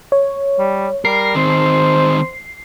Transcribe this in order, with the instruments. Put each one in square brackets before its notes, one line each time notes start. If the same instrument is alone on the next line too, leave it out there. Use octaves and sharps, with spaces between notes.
[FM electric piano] C#5
[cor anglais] G3
[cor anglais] G3 [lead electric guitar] A#4 [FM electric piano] C7
[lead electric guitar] D#3 C4 [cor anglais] C5